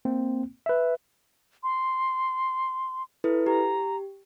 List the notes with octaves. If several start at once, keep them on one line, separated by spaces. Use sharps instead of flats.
A#3 C4
B4 E5
C6
E4 A4 B4
G4 A#5